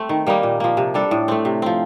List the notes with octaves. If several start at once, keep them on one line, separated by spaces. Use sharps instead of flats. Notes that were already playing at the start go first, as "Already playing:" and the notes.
Already playing: A3 C4
D#3
G3 A#3 D#4
A#2
F3 A#3
C3
G3 D4 A4
A2
A3 C4
C3
F3 C4